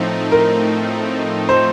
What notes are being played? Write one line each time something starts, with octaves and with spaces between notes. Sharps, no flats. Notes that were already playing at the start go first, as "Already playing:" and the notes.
Already playing: A2 F3 A3 C4 D#4
A#4
C5